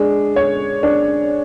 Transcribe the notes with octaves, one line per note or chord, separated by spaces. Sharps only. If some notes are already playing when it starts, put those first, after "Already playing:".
Already playing: G#3 D4
C#5
D4